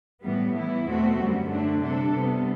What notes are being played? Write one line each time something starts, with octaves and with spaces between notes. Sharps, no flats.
A2 E3 G3 B3
E3 B3 E4
E2 B2 A3 C4 F#4
F#2 D3 G3
D3 A3 D4
C3 G3 D4 A4
C3 G3 B3